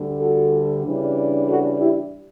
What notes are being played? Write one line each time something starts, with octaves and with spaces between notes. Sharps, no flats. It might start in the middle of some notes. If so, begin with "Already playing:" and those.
Already playing: D2 D3 G3
F#4 A4
C#3 E3 G3 D4
F#4 A4
E4 G4